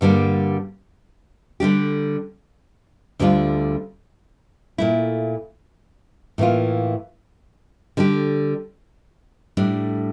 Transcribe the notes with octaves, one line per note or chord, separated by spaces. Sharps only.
G2 D3 G3 A#3
D3 G3 D4 G4
D2 D3 G3 D4 F4
A#2 A3 E4
A2 E3 A#3 F4
D3 G3 D4 G4
A2 G3 D4